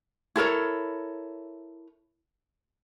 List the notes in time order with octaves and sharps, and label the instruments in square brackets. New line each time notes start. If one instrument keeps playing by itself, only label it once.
[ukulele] E4 A4 A#4 C#5